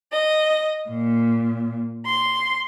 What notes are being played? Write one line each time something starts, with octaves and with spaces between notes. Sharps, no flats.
D#5
A#2
C6